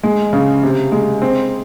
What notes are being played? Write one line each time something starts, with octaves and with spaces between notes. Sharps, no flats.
G#3
C#3
C3
G#3
C4